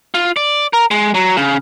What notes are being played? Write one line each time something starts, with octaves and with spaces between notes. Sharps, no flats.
F4
D5
A#4
G#3
F#3
C#3